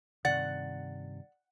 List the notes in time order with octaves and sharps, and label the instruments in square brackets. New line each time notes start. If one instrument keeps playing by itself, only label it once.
[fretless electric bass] G2 C3 D#3 [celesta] D5 A6 [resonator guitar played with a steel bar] F#5